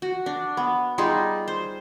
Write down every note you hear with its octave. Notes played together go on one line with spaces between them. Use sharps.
F#4
D4
B3
G3 D#4 F4 G#4
C5